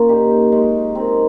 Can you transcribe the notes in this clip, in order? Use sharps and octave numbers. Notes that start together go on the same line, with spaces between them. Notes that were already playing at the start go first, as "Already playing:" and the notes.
Already playing: A#3 C#4 F4
A#2 D#4 G4
G#3 C#4
D#3 C4